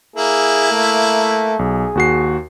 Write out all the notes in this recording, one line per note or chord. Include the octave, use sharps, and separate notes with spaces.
A#3 E4 G#4
A3
B1 G#4
D#2 F#4 C7